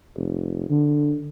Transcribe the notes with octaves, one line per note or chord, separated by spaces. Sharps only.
F1
D3